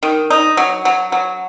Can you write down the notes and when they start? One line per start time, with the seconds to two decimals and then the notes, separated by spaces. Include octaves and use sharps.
0.03 D#3
0.30 D#4
0.57 F#3
0.85 F#3
1.12 F#3